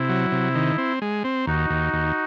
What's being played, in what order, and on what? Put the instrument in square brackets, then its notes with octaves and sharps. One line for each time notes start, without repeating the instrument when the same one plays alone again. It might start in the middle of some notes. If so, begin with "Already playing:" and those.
Already playing: [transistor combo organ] C3 [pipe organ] E4
[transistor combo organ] F#3
C3
D#3
C4
G#3
C4
[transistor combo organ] D#2 [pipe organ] D#4 F#4
[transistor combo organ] D#2
D#2